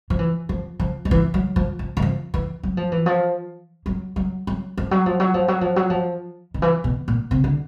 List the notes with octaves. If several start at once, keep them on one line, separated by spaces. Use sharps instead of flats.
F3
E3
F3
F3
F3
E3
F#3
F3
F3
E3
F3
E3
F#3
F3
E3
F3
F#3
F#3
F#3
F3
F#3
F3
F#3
F3
F#3
F3
F#3
F3
D#3
E3
B2
A#2
C3
D3